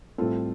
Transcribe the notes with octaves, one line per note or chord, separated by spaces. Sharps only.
A2 G3 C4 F4 A4